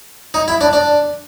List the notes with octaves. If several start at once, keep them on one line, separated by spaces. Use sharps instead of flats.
D#4
E4
D4
D4